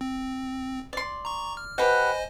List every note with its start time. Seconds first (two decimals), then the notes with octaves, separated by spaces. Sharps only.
0.01 C4
0.93 D5 C6
1.25 A#5 C#6
1.57 F6
1.78 G4 B4 C5 D#5 F#5 G#5